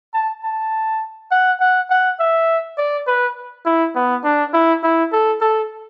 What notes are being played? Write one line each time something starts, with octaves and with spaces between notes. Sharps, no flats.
A5
A5
F#5
F#5
F#5
E5
D5
B4
E4
B3
D4
E4
E4
A4
A4